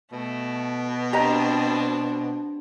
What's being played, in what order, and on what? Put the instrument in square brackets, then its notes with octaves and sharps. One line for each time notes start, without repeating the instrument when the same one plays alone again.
[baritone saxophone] B2 [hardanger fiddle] A3
[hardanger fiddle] C4 D4 [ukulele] G4 D#5 A#5